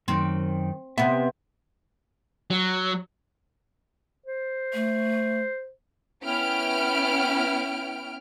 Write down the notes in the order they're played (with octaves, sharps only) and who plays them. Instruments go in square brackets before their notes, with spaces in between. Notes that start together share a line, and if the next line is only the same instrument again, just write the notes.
[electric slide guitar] F#2 D#3 [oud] C4
[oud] C3 B3 [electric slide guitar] E5
[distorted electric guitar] F#3
[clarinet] C5
[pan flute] A3
[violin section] B3 C#4 E4 G5 F6 D7